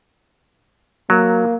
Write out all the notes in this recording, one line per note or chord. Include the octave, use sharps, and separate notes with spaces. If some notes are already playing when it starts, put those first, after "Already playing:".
F#3 A#3